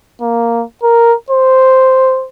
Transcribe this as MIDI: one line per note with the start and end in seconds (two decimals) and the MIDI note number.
0.21 0.64 58
0.83 1.14 70
1.30 2.27 72